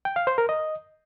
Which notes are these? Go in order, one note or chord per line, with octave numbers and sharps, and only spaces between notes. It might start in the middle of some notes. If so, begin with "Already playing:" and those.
G5
F5
C5
A#4
D#5